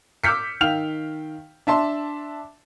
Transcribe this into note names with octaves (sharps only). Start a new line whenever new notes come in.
D6 E6 F6 G6 B6 C#7
D#3 F5 G5 F6 F7
D4 E5 A5 C6